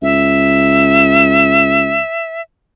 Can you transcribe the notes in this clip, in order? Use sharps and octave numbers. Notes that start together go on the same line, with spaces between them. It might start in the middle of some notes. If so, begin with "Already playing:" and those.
C#2 E5